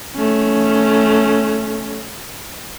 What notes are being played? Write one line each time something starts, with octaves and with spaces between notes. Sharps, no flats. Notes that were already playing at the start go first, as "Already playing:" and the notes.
A3 C#4